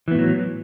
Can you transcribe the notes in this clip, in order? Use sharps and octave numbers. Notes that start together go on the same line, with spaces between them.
A2 E3 F#3 B3